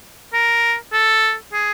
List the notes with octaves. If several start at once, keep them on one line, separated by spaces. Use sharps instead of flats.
A#4
A4
G#4